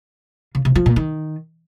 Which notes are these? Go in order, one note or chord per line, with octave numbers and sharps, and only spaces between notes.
C#3
C3
F3
A#2
D#3